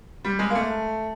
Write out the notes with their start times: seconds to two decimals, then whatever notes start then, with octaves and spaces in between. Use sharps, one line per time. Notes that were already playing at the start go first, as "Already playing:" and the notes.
0.24 G3
0.39 G#3
0.50 A#3
0.55 A3